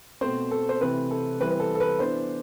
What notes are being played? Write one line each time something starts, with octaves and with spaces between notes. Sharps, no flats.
B2 A3 C4 C5
A4
C5
C3 E3 A3 C4 B4
A4
E3 G3 C4 B4
B4
A4
A4
B4
E3 B3 D4 C5